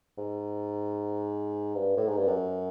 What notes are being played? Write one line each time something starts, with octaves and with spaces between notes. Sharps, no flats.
G#2
G2
A2
G#2
G2
F#2